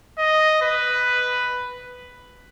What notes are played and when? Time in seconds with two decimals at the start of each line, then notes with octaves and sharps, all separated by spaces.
0.19 D#5
0.62 B4